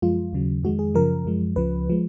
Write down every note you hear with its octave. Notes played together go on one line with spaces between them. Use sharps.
F#2 F3 G#3 F4
D#2 C#3 F#3
F2 D#3 G#3 F#4
G#4
F#2 C#3 F3 A#4
F#2 F3 G#3
C#2 C#3 F3 B4
F3 G#3